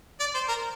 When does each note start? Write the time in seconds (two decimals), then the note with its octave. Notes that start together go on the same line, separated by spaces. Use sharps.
0.20 D5
0.34 C5
0.48 A#4